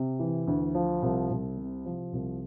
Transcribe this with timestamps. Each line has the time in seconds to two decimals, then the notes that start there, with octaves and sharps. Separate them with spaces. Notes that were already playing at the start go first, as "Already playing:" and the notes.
Already playing: C3
0.19 E3
0.47 D2
0.75 F3
1.02 C2
1.30 C2
1.57 C3
1.85 F3
2.13 C2